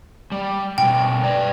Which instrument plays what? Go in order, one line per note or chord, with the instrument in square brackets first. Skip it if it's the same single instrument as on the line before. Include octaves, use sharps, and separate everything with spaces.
[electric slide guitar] G3
[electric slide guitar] B2 G3 [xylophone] G5
[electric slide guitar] B4 D5